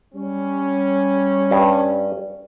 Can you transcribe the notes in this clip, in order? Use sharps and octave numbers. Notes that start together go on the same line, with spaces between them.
G3 C#4
G2